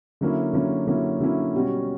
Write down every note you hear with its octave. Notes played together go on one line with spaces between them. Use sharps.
D3 F#3 A#3 C#4 E4
D3 F#3 A#3 C#4 E4
D3 F#3 A#3 C#4 E4
D3 F#3 A#3 C#4 E4
B2 G3 C#4 F#4